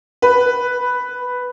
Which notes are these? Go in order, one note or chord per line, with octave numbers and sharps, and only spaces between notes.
B4